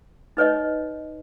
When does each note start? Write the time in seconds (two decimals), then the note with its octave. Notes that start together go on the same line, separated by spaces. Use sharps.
0.37 D#4 B4 C#5 D#5